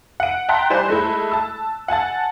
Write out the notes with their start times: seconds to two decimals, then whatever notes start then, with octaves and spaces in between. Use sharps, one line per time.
0.20 F#5 D7
0.49 G5 A5 A#5 C6 F#6 B6
0.70 G3 E4 C5 D5 G#5 E7
0.88 G#3 A3 E4
1.32 A5 E6
1.88 F#5 G#5 A5 A6